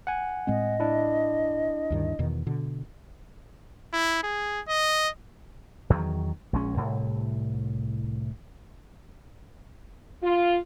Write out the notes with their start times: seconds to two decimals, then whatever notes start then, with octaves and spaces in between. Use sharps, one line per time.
0.07 F#5 G#5
0.47 A2 G#3 C4 D#5
0.80 D4 E4
1.90 D2 G2 D#3
2.19 E2 B2 D#3
2.47 B2 D3
3.93 E4
4.23 G#4
4.68 D#5
5.90 E2 D#3 F#3
6.53 A#1 G#3 C#4
6.77 C2 A2
10.23 F4